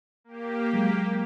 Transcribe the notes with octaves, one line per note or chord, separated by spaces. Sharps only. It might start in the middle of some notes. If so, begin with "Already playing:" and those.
A#3 G4
F#3 G#3